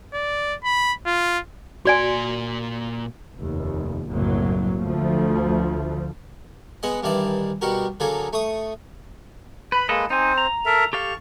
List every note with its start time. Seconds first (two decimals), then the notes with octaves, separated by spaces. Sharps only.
0.14 D5
0.64 B5
1.07 F4
1.85 A#2 F#4 D5 G#5 C6
3.37 F1 D#2
4.10 F#1 C2 A2 F#3 A#3
4.78 D2 F3 A3
6.83 G#3 B3 D#5 F#5
7.03 G2 D#3 E3 D5 A5
7.61 B2 G3 F#4 G4 A#4
8.00 D3 F#3 A#3 G#4 A4
8.33 A3 C#6 D#6
9.72 B4 B5
9.89 G#3 A#3 A4 B4 D#5
10.10 C4 D#4 C5 G#5
10.38 A#5
10.65 A4 A#4 E5
10.93 G4 A4 F5 C#6